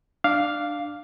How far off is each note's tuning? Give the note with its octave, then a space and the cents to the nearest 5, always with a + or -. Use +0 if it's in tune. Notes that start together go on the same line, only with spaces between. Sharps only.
D4 +20 F5 +0 D6 -10